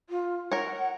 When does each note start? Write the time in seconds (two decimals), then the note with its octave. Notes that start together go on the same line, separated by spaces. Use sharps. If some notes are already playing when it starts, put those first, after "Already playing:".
0.09 F4
0.52 A#4 C#5 F#5